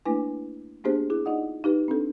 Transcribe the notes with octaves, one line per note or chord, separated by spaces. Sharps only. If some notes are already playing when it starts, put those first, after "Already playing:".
A3 A#3 D4 E4 B4 G#5
A#3 B3 D4 G4 G#4 C5
E4 G#4
D#4 F4 D5 D#5 F#5 D#6
D#4 G4 B4
C4 D4 A4